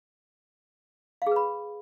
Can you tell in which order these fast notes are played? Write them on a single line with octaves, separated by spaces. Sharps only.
F5 G#4 B4 B5